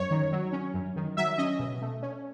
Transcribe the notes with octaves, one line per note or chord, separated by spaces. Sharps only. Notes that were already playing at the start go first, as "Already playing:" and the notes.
Already playing: F#2 C#5
D#3
F#3
C#4
F#2
D#3
F#3 E5
C#4 D#5
B2
A3
C#4